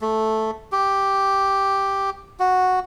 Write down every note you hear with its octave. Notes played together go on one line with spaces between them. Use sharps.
A3
G4
F#4